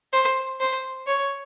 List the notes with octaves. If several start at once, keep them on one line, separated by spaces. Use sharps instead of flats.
C5
C5
C#5